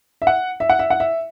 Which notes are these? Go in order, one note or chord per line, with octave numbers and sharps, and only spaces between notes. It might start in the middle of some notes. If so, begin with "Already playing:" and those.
E5
F#5
E5
F#5
E5
F#5
E5